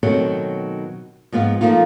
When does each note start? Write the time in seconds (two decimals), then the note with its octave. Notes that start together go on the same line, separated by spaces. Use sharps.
0.03 B2 D#3 F#3 A3 C4
1.32 G#2 F3 B3 F4
1.61 F3 A3 A#3 D#4 F4